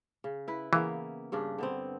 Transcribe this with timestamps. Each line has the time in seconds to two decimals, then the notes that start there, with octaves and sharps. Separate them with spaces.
0.24 C#3
0.48 E4 B4
0.73 C#3 E3 A#3 B3
1.32 G2 C#3 D4
1.58 D3 B3 C4